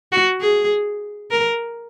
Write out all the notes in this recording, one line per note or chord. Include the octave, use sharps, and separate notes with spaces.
F#4
G#4
A#4